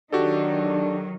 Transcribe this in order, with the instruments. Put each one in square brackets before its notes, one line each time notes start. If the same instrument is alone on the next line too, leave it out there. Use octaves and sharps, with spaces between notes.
[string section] D#3 F#3 [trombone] D4 [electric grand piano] F#4 G4 A4